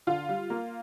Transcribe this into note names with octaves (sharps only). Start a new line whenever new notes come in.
D3 F4
G3
A#3